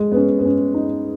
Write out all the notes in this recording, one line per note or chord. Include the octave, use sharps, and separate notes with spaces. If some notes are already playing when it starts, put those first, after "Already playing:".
Already playing: G#3
B3
C#4
B3
C#4
D#4